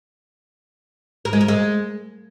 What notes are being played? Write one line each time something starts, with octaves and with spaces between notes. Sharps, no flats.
A#4
G#3
A#4
G#3